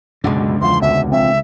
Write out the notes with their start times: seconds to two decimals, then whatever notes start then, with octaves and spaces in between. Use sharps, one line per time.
0.24 C#2 F#2 B2 D3 G#3
0.61 E2 F3 C6
0.81 F1 D2 B2 E5
1.12 B1 F3 C4 E5